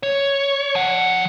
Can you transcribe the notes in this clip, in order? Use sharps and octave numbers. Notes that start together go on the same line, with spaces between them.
C#5
F3 F#5